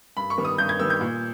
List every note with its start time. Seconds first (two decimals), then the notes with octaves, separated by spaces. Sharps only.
0.17 G2 B5
0.30 C#6
0.38 D#3 G3 B3
0.45 D#6
0.58 G2 G6
0.69 G#6
0.79 D#3 G3 B3 E6
0.90 G6
1.01 A#2